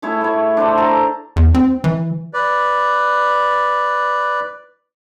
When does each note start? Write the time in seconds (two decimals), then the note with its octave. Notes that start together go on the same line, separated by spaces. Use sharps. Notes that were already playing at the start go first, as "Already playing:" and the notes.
0.02 A3 E4 G#4 C#5
0.21 A2 C#5
0.57 D4 C5 C6
0.78 A4 A#5 C6
1.36 E2
1.55 C4
1.84 E3
2.33 B4 D5